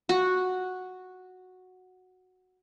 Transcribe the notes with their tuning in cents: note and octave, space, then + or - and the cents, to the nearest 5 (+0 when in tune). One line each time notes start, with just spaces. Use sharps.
F#4 -5